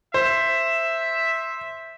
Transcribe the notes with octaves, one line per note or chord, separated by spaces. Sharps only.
C5 E5